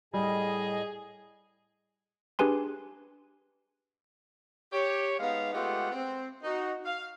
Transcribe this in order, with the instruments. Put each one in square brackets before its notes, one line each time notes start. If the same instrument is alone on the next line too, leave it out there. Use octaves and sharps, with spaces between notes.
[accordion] A2 D#5 [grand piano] G3 [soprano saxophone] G#4
[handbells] D4 G4 G#4 B4 G#5 C6
[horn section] G4 C#5
G#3 B3 D#4 F5
G#3 A3 B3 F4 G4 F#5
C4
D#4 F#4
F5